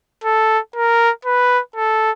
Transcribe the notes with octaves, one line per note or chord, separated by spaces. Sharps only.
A4
A#4
B4
A4